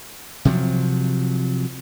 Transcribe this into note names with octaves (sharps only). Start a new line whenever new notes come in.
C3 F3 F#3